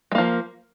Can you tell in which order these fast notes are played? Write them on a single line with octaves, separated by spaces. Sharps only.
G#3 A#3 F3